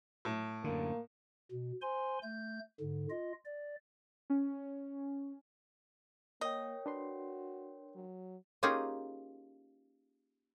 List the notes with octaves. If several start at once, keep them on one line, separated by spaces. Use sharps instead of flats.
A2
F#2 D3 A#3
B2
C5 G#5 C6
A3 G6
G#2 D3
F4 D#5
D5
C#4
A#3 A#4 C#5 D#5 G5
D4 F#4 B4 C6
F#3
A#3 C#4 D#4 F4 G4 G#4